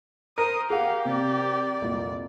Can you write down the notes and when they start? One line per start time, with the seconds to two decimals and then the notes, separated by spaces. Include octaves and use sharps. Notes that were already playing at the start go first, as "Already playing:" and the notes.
0.38 A#4 C5 D#6
0.70 G4 G#4 F5 F#5
1.05 C3 D5
1.81 F1 C2 A#2